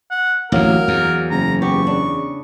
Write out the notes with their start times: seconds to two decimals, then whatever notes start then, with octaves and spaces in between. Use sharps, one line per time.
0.11 F#5
0.52 A1 D2 F#3 G#3 A#3 A#4
0.88 E2
1.31 F#1 A#5
1.62 B3 G4 C#6
1.87 C#3 D4